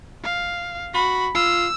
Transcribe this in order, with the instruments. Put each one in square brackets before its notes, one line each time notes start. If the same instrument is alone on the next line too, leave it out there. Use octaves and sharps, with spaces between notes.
[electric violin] F5
[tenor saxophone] F#4 [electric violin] B5
[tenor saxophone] F4 [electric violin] E6